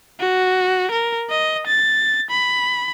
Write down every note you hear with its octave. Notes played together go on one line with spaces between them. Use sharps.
F#4
A#4
D#5
A6
B5